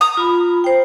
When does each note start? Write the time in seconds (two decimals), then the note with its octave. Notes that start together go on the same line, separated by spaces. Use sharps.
0.01 A#5 D#6
0.17 F4 B5
0.64 C5 G5